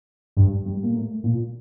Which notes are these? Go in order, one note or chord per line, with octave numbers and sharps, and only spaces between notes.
G2
G2
A#2
A2
A#2